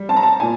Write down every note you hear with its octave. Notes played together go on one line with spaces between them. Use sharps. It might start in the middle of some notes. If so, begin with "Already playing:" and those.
Already playing: G3
C4 A5
A#5
A5
A#2 G#5